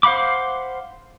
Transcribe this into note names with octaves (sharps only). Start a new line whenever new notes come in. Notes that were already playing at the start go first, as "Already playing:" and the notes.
C5 F5 F#5 B5 D6